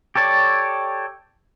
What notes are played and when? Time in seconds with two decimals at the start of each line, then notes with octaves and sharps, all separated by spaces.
0.15 G4 A4 C#5 D5